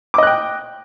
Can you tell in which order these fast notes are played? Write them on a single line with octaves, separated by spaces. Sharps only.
D6 D#5 F#6 G5